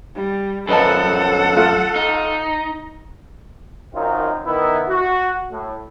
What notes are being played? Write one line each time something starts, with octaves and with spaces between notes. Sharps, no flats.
G3
F#2 F3 A4 B4 D#5 F#5 A5
A3 F4 F#6
D#4
F#2 D#3 F#3 C4 D#4 F4
D#3 B3 E4
F#4
A2